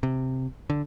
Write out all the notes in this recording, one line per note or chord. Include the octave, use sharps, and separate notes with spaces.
C3
D3